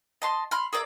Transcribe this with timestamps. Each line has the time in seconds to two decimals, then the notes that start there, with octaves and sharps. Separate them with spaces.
0.22 D#5 A5 C6
0.51 B5 C6 F6
0.73 G#4 A#4 D5 E5